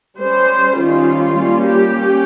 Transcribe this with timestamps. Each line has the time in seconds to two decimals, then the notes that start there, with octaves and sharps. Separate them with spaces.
0.19 G3 C#4 C5
0.78 D#3 G3 C#4 F4
1.37 G3 A#3 C#4
1.66 G4
1.95 C#4